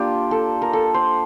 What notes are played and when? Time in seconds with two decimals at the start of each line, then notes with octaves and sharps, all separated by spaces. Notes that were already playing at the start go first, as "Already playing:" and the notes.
Already playing: A#3 D4 F4 G4
0.31 A4
0.62 A#4
0.73 A4
0.94 C5